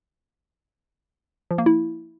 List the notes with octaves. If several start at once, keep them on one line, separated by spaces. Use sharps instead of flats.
F3
A#3
E4